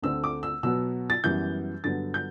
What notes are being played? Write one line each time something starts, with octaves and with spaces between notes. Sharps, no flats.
D2 D3 A3 C4 E6
D6
E6
B2 F#3 B3 E6
A6
F#2 E3 G3 B3 G6
G2 D3 F#3 B3 A6
G6